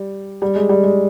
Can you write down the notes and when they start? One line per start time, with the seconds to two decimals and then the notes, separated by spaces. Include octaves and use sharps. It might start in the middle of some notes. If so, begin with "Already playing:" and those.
Already playing: G3
0.42 G3
0.56 G#3
0.69 G3
0.83 G#3